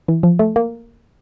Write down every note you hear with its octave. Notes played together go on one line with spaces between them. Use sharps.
E3
F3
A3
A#3